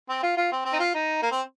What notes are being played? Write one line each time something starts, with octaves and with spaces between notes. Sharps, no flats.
C4
F4
F4
C4
C4
D#4
F4
D#4
A#3
C4